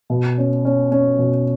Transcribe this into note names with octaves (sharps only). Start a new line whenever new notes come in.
B2
C#4
C#4
C#4
B2